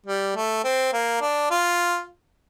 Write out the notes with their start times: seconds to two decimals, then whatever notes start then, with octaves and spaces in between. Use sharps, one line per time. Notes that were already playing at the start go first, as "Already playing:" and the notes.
0.06 G3
0.36 A3
0.64 C4
0.93 A#3
1.21 D4
1.51 F4